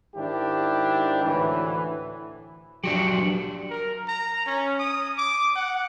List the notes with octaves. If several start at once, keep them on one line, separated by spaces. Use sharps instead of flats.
G#2 D#3 D4 E4 G4
D2 A2 E3
F#3 D4 F#4 G4
A#4
A#5
C#4
D#6
D6
F#5